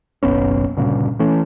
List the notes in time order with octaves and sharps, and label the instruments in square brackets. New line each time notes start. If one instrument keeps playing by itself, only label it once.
[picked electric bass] F#1 B1 B3 C#4
D2 G2 A#2 C#3
E3 A3 C#4